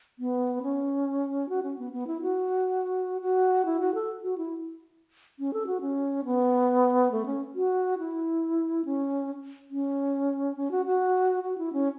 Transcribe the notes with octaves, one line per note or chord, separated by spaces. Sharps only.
B3
C#4
F#4
C#4
B3
B3
E4
F#4
F#4
E4
F#4
A4
F#4
E4
C#4
A4
F#4
C#4
B3
A3
C#4
F#4
E4
C#4
C#4
C#4
F#4
F#4
F#4
E4
C#4